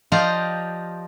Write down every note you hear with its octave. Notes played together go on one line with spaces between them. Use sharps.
F3 G4 D5 D#5 F5 A#5